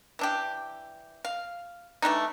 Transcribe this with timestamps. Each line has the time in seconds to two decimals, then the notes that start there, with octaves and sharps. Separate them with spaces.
0.19 E3 D4 G4
1.25 F5
2.02 E3 A3 D4 D#4